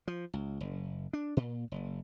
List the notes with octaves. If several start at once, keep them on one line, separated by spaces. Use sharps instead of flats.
F3
C#2
F#1
D4
A#2
F#1